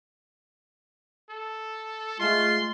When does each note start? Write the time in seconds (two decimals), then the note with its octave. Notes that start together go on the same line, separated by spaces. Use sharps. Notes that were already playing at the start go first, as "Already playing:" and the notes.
1.29 A4
2.19 G#3 A3 F4 C6